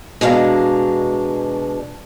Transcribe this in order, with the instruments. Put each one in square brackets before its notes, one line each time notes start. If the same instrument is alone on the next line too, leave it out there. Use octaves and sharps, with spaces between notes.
[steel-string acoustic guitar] B2 G#3 D4 F5 A#5